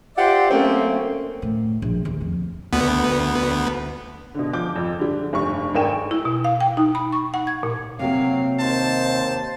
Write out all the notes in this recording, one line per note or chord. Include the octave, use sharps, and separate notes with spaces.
F4 G4 C5 D5 E5 F#5
F#3 A3 A#3 C4 C#4
A2
A#1
D#2
F2
D2 B3
B2 D3
F3 D6 G6
F2
D3 G3
F1 G2 C#6
G#1 D4 A#4 G5 G#5 E7
E4
B2
F5
G5
D#4
B5
C#6
F#5
G#6
A#2
C3 F#3 A#3 F5
D#2 C5 A5